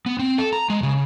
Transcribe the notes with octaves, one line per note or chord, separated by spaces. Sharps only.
B3
C4
A4
A#5
G#3
C#3